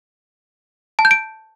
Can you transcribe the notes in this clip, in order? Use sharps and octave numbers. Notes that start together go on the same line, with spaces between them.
A5
G6
D7